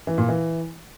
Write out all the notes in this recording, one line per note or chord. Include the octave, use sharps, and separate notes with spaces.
E3
A#2
E3